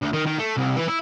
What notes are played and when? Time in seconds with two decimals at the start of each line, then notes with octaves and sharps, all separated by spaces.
0.02 D2
0.13 D#3
0.27 D#3
0.39 A3
0.57 C2
0.77 E3
0.89 E4